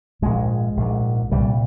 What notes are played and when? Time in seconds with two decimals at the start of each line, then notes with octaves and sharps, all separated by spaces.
0.22 A#1 G#2 G#3
0.77 A#1 G#2
1.31 C2 A#2 G3